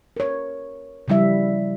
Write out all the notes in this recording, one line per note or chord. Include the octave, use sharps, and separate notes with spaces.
A#4 C#5
C#3 F3 G3 E4 E5